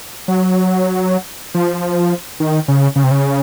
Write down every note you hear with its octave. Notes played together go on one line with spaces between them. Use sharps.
F#3
F3
D#3
C#3
C#3
C3
C#3